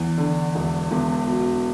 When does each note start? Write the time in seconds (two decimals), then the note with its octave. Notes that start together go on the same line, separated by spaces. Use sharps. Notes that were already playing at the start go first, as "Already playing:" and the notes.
Already playing: E2
0.18 D3
0.55 E1
0.91 E1
1.27 B2